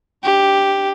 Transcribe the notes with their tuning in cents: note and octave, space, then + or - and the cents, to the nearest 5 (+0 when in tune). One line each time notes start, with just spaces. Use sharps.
D4 +0 G4 +0